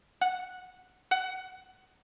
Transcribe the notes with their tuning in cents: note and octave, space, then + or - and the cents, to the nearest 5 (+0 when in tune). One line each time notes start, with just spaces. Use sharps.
F#5 -5
F#5 +20